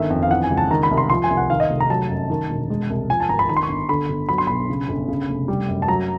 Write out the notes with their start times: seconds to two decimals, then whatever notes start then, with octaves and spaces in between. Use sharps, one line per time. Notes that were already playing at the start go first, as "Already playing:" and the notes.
Already playing: G1 D#3 E5
0.10 F2
0.23 F5
0.31 E3 F#5
0.43 G#5
0.50 C#2
0.57 A5
0.71 D#3 A#5
0.83 B5
0.91 C2
0.97 C6
1.10 F3 C6
1.24 G#5
1.30 C2
1.37 F#5
1.50 D#3 F5
1.60 D#5
1.70 F1
1.80 A#5
1.90 F#3 A5
2.10 F#2
2.30 D#3
2.50 E1
2.70 G#3
2.90 C2
3.09 F3 G#5
3.20 A5
3.29 G#1 A#5
3.39 B5
3.49 D#3 B5
3.57 C6
3.63 C#6
3.69 G1
3.89 D3 B5
4.09 G1
4.29 F#3 B5
4.38 C6
4.47 B1 B5
4.69 C#3
4.89 G1
5.08 C#3
5.29 F1
5.48 G3
5.68 F#2
5.82 A5
5.88 F#3 A#5